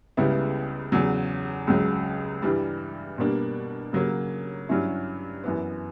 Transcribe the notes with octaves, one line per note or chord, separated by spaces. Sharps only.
C#2 C#3 G3 B3 E4
E2 C#3 F#3
C#2 C#3 F#3
G2 E3 G3
B2 G3 A#3 D4
C#3 F#3 A#3
G2 F#3 C#4 E4
F#2 E3 B3